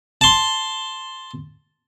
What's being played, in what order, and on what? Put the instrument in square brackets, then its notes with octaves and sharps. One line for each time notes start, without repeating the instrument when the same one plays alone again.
[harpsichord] A5 C6